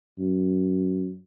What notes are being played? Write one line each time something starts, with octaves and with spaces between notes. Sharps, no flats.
F#2